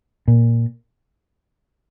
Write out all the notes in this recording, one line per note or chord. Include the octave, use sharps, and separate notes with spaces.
A#2